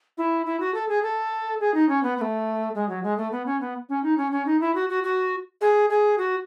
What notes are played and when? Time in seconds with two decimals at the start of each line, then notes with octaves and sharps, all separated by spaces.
0.18 E4
0.46 E4
0.60 F#4
0.74 A4
0.89 G#4
1.03 A4
1.60 G#4
1.74 D#4
1.89 C#4
2.03 B3
2.18 B3
2.21 A3
2.75 G#3
2.89 F#3
3.03 G#3
3.17 A3
3.32 B3
3.46 C#4
3.61 B3
3.89 C#4
4.04 D#4
4.18 C#4
4.32 C#4
4.46 D#4
4.61 E4
4.75 F#4
4.89 F#4
5.04 F#4
5.61 G#4
5.90 G#4
6.18 F#4